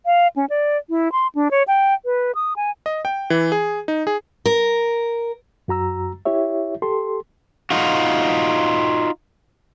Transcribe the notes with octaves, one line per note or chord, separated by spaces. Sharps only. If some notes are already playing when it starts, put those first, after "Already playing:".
F5
C#4
D5
E4
C6
D4
C#5
G5
B4
D#6
G#5
D#5
G5
E3
G#4
D#4
G#4
A#4
F#2 F#4 A#5 E6
E4 G4 C#5 E5
G4 A4 C6
D#4 F4 F#4